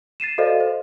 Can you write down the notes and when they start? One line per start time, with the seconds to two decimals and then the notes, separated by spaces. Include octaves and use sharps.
0.20 A6 C7 D#7 E7
0.38 F#4 A4 C5 D5 D#5 F5
0.60 C5